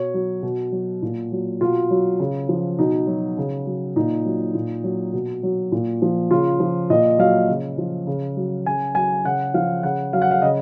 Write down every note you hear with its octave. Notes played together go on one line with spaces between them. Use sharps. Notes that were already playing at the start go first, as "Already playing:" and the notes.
Already playing: B2 C#5
F#3
B2
F#3
A#2
F#3
B2 F4
F#3
C#3
F3
B2 D#4
F#3
C#3
F#3
A#2 D#4
F#3
A#2
F#3
B2
F#3
A#2
F3
C#3 F4
F3
A#2 D#5
F#3 F5
C#3
F3
C#3
F#3
C#3 G#5
F#3 G#5
C#3 F#5
F3 F5
C#3 F#5
F#3 F5
F#5
F5
C#3 D#5